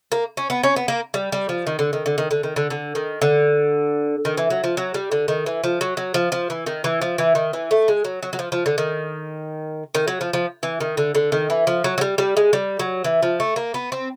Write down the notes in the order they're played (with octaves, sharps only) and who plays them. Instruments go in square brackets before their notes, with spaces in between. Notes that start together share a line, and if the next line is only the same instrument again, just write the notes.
[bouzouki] A#3
C#4
B3
C#4
B3
A#3
G3
G3
F3
D#3
D3
D#3
D3
D#3
D3
D#3
D3
D3
D#3
D3
D#3
E3
F#3
F3
F#3
G3
D3
D#3
E3
F3
F#3
F#3
F3
F3
E3
D#3
E3
F3
E3
D#3
E3
A3
G#3
F#3
F#3
F#3
F3
F3
D3
D#3
D#3
F#3
F3
F3
E3
D#3
D3
D3
D#3
E3
F3
F#3
F#3
G3
G3
G#3
G3
F#3
E3
F3
A3
A#3
B3
C4